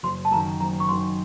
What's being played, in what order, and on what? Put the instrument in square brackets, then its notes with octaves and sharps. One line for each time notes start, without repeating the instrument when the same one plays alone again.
[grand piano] F#1 [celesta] C6
[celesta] A5
[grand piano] F#2 D#3 [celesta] A#5
[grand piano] F#1 [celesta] A#5
[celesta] C#6
[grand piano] F#2 D#3 [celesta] C6